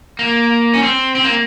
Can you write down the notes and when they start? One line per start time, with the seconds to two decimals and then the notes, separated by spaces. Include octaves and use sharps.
0.19 A#3
0.74 C#4
0.83 C4
1.15 C4
1.24 A#3